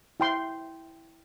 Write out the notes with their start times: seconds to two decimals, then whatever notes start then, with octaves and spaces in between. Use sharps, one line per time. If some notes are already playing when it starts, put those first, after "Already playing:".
0.20 E4 G5 C6